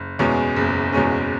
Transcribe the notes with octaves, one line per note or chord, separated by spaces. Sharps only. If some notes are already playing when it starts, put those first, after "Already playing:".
Already playing: F#1
E2 B2 G#3 C#4
F#1
E2 B2 G#3 C#4